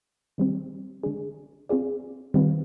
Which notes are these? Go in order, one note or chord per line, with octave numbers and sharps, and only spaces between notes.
D#3 G3 C4
D3 G#3 D4 G#4
C4 F4 G#4 D5
D#3 G3 C4 F4 B4